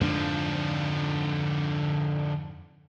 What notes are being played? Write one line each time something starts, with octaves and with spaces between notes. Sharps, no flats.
F2 G#2 D3 F3 D4